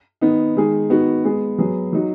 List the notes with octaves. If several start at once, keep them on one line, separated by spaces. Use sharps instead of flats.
D#3 B3 D#4
D#3 G#3 D#4 G#4
D#3 B3 D#4 F#4
G#3 B3 G#4
F#3 B3 G#4
F#3 D#4 F#4